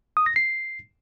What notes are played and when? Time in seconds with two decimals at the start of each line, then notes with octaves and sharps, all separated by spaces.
0.17 D#6
0.26 A#6
0.36 C7